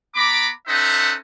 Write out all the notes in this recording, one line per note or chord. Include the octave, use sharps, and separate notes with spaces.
B3 A#5 B5 D6
C#4 D#4 A4 C5 E5 F#5